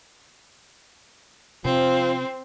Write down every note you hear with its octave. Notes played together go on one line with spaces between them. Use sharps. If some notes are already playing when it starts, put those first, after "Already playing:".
C3 F3 C4